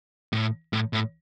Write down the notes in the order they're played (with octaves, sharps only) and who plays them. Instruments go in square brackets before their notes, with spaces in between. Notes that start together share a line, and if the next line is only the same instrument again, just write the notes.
[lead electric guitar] A2
A2
A2